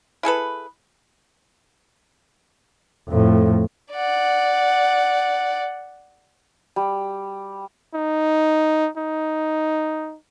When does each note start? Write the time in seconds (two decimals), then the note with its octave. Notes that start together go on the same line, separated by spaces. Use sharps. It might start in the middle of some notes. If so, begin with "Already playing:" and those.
0.23 E4 G#4 A4 B4
3.08 F2 A2
3.92 D5 F#5
6.76 G3
7.94 D#4
8.97 D#4